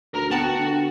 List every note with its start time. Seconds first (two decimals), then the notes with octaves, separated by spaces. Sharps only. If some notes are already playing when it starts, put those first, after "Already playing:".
0.14 D2 A#4 A#5
0.31 B3 F#4 G5 A5
0.59 D3 F#5